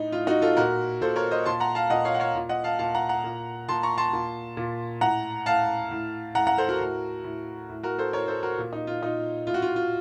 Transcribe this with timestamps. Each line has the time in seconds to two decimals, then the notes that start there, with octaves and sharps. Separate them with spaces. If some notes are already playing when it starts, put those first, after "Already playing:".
Already playing: A2 D#4
0.12 A2 F4
0.27 D#4 F#4
0.42 F4 A4
0.57 A#2 F#4 A#4
1.01 A#2 A4 C5
1.16 A#4 C#5
1.31 C5 D#5
1.45 A#2 A5 C6
1.60 F#5 A#5
1.75 F5 A5
1.90 A#2 D#5 F#5
2.05 C#5 F5
2.14 F#5
2.20 C#5 F5
2.35 A#2
2.49 D#5 F#5
2.64 F5 A5
2.79 A#2 F5 A5
2.95 F#5 A#5
3.09 F#5 A#5
3.24 A#2
3.68 A#2 A5 C6
3.83 A#5 C#6
3.98 A5 C6
4.13 A#2
4.57 A#2
5.01 A2 F#5 A#5
5.46 A2 F5 A5
5.91 A2
6.35 A2 F#5 A#5
6.47 F#5 A#5
6.58 A4 C5
6.69 F#4 A#4
6.80 A2
7.24 A2
7.69 A2
7.83 F#4 A#4
7.98 A4 C5
8.13 A2 A#4 C#5
8.28 A4 C5
8.43 F#4 A#4
8.58 A#2
8.73 D#4
8.87 F4
9.02 A#2 D#4
9.47 A2 F4
9.54 F#4
9.62 F4
9.76 F4